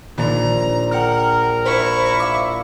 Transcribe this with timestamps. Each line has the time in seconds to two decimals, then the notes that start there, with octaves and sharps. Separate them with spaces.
0.18 A#1 D#3 A#3 A#5
0.91 A#4 F#5 G5 A#5 F6
1.65 E4 C5 C#6
2.20 E5 F5 D6